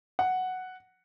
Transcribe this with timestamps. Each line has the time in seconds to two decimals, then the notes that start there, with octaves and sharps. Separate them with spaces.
0.19 F#5